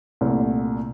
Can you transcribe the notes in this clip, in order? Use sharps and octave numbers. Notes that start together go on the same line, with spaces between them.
C2 A#2 A3